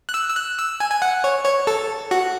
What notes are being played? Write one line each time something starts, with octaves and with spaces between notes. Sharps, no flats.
F#6
E6
E6
F#6
E6
G#5
G#5
F#5
C#5
C#5
A4
F#4